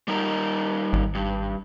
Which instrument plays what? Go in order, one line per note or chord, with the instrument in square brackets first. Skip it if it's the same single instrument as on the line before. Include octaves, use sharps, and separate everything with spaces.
[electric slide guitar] G3 D#4 A#4
[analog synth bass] G#1
[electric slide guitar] G2